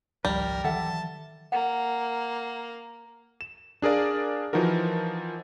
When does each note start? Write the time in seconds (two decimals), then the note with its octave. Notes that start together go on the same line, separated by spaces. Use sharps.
0.25 G#1 C#2 F3 G3 A#4
0.64 D#3 E3 F#3 A4 E5 F#5 A5
1.52 A#3 F#5
3.41 E7
3.82 D4 G#4 A#4 D5 F5
4.53 E3 F3 D#4 F#4 A#4